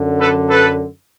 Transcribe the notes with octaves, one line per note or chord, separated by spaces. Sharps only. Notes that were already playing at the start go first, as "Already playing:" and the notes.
Already playing: F#2 D3
A4 B4
A4 B4